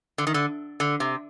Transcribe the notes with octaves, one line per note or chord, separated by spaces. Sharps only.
D3
D#3
D3
D3
C3